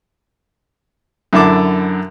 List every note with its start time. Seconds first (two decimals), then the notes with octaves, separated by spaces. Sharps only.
1.33 F#2 D3 E4 A5 D6